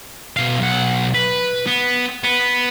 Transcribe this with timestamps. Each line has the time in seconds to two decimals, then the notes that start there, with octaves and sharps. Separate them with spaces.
0.37 B2 F5
0.59 B1 F#5
1.14 B4
1.67 B3
2.24 B3